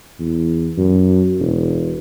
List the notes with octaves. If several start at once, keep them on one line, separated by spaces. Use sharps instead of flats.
E2
F#2
E1